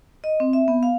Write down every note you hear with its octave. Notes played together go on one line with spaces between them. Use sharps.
D#5
C4
E5
B3
F5